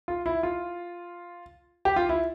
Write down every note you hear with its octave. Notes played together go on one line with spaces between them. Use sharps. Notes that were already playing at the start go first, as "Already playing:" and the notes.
F4
E4
F4
G4
F4
E4